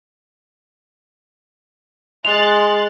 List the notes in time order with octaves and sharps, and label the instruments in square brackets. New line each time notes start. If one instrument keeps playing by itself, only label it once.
[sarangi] G#3 [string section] C6 F#6 A6 [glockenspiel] F7